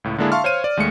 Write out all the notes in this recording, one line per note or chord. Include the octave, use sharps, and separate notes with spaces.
C#2 A2
D3 G#3 A#3 D4 E4 G#4
E5 F5 A5 C6 C#6 F6
C5 C#5 F5 C6 D#7
D5
D#2 G#3 A3 C#7